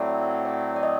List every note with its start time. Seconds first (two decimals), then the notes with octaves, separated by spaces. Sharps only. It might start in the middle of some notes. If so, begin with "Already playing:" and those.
Already playing: A2 F#3 A3 C4 D5
0.45 D5
0.76 D5
0.83 D#5